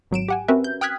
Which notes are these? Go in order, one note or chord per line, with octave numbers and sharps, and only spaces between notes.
G#1 F#3 D7 E7
G4 F#5 G#5
C4 C#4 F#4 A#4 B4 E5
G6
G5 D#6 F6 F#6 G#6 B6